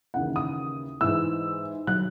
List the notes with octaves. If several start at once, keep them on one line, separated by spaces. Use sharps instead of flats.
D#2 C#3 E3 F#5
D#6
G#2 E3 E6
D#3 F#3 F#6